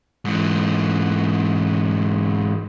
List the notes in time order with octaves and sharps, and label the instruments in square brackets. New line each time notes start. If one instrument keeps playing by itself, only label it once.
[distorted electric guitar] G#2 E3